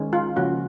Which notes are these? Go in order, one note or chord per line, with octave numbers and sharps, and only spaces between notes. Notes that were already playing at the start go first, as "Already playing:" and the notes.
Already playing: D#3 G#3 C#4
F4
C#3 F3 A#3 C#4 F#4